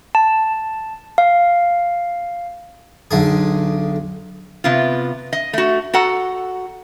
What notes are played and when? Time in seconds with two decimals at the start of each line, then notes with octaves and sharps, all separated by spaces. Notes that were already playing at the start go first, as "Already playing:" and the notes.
0.15 A5
1.18 F5
3.11 B1 D3 G#4
4.64 C3 B3 F4
5.33 D#5
5.53 A3 F#4
5.94 F#4 A4 F#5 A#5